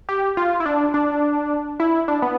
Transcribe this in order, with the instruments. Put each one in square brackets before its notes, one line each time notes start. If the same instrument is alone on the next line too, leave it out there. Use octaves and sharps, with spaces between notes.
[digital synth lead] G4
F4
E4
D4
D4
E4
D4
B3